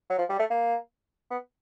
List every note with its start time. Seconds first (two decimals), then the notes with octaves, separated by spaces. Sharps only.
0.10 F#3
0.19 F3
0.30 G3
0.39 A3
0.50 A#3
1.31 B3